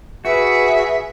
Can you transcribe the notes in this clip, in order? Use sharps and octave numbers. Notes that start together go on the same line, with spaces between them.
F#4 G#4 B4 E5